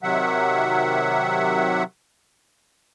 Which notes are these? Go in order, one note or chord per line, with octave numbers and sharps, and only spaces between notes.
C3 D#3 F#3 E5 F#5